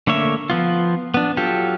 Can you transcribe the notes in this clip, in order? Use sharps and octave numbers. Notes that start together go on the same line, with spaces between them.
D3 A3 A#3 C#5 E5
F3 B3 F4
B3 D4
F#3 F4 G4 A4